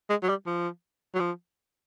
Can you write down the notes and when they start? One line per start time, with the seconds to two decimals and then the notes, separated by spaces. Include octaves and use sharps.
0.10 G#3
0.23 F#3
0.29 G3
0.46 F3
1.14 F#3
1.20 F3